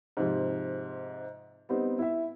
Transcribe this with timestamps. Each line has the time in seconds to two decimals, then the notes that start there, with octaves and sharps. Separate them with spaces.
0.17 G#2 C3 F3
1.69 G3 B3 C4 D#4
1.99 E4 E5